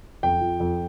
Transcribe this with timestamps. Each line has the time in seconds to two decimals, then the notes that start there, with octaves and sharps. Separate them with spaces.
0.23 F2 G5
0.41 F3
0.60 F2